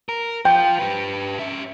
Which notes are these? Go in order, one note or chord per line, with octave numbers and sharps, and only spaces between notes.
A#4
F4 C5 G5
G4 B4
C#4 E5